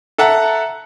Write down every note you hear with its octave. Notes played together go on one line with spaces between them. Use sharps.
A4 E5 F#5 A5 A#5